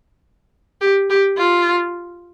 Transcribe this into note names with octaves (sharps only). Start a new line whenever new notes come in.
G4
G4
F4